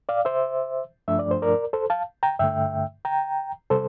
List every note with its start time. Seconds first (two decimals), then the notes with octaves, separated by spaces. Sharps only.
0.09 D5 F5
0.25 C5 E5
1.08 G2 F3 A3 D4 E5
1.19 D5
1.31 C5
1.42 A#4 D5
1.73 A4 C5
1.90 F5 A5
2.23 G5 A#5
2.39 G2 D3 A3 E5 G5
3.05 G5 A#5
3.70 C3 G3 A4 C5